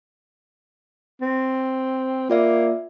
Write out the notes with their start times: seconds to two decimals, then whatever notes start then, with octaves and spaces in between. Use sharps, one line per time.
1.21 C4
2.30 A#3 F4 D5 E5